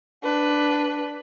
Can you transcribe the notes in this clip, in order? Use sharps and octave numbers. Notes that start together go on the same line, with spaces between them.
D4 B4